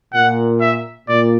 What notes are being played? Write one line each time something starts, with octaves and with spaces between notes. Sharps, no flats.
A#2 F#5
E5
A#2 D5